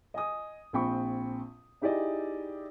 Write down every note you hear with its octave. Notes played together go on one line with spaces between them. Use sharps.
D#5 G#5 D#6
A#1 C4 G5 B5 C#6
D#4 E4 G4 G#4 D5 D#5